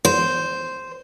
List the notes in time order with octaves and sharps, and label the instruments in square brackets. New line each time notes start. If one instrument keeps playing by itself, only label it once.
[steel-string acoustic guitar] C5